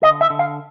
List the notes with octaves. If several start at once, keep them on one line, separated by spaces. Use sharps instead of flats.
D3 D#5
E5
D3
F5